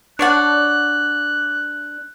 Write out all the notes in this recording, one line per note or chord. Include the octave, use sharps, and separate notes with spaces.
D4 C#5 D5 F#5 F#6